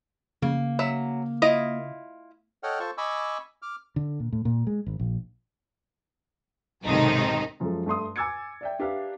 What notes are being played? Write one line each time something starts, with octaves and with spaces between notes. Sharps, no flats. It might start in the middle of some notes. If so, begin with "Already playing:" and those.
C#3 A#3
F#3 E5
E4 F4 D#5
A4 C#5 D#5 F#5 G5 F6
F4 A4 C5 A5 C#6
D#5 G#5 B5 C#6 D6 E6
D6 F6
D3
A#2
A2
A#2
G#3
G#1
A#1
B1 G#2 C3 D#3 D#4 A4
F#2 F3 G#3 A4
G2 A3 C6 D#6
G#5 D6 E6 G#6 A6 C#7
D5 E5 G5
D4 G4 A#4 B4 E5 F5